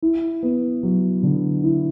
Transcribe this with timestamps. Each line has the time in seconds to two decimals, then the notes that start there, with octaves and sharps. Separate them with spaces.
0.02 E4
0.43 B3
0.83 F#3
1.23 D3
1.64 E4